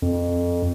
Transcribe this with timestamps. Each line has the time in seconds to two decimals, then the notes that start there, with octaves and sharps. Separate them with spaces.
0.02 F2